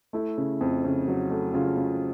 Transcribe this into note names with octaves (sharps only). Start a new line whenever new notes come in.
A3 E4
C#3
F2
C#3
F#3
A3
C#3 F4
C#3